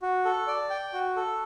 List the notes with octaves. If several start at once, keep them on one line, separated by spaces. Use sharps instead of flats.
F#4
A4
D5
G5
F#4
A4